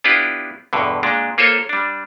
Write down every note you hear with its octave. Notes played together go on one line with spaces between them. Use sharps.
B3 D4 E4 F4 G4 B4
E2 G2 B2 D3
A#2 G#3 D4
A#3 F4 A4 C5 C#5
G3 D4